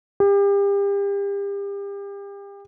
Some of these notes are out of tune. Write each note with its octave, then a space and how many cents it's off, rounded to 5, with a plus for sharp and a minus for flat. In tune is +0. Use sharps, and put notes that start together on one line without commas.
G4 +35